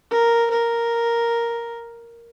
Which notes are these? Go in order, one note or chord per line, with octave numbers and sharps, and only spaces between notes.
A#4
A#4